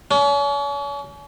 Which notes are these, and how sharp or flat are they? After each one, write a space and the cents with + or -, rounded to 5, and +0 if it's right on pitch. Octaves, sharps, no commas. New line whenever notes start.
C#4 +40